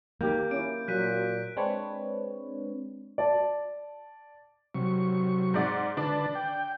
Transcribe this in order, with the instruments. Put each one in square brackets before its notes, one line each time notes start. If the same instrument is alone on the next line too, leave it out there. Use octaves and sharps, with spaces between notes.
[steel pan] D#3 G4 [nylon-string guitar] A#3 [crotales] G6
[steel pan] C#4 E4 [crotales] D7
[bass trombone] A#2 [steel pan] F#3 [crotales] F#6 B6 D#7
[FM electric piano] G#3 C4 D4 B4 C#5
[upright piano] D5 A5
[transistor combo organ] C3 F#3 C#6
[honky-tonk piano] G#2 D5 F#5
[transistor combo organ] D3 B4 A5 [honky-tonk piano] D4 D5
[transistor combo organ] G5